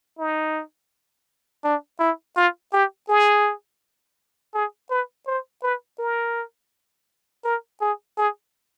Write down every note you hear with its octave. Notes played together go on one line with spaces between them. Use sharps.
D#4
D4
E4
F4
G4
G#4
G#4
B4
C5
B4
A#4
A#4
G#4
G#4